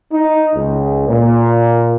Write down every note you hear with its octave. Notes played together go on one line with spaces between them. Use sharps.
D#4
C#2
A#2